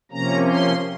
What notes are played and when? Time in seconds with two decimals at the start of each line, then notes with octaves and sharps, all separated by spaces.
0.11 C3 F3 A#3 C#4 A#5
0.49 C6